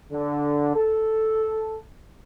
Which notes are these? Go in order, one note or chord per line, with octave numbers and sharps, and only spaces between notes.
D3
A4